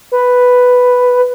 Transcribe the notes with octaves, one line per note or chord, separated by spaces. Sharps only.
B4